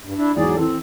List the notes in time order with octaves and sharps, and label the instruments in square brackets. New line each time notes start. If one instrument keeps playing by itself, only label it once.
[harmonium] G2
D4 E4
[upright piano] E2 G#2 [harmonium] F#3 G#4 D5
[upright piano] E3 A4 [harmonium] C4